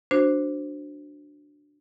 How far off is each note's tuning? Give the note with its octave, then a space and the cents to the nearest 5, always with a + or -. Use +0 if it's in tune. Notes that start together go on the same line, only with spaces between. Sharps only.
D4 +0 F#4 -5 C5 +0